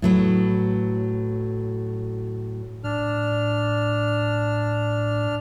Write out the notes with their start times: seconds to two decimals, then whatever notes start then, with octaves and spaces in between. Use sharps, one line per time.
0.02 A2 F#3 B4
2.84 A2 D4 F6